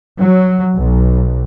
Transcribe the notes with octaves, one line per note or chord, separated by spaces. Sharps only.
F#3
B1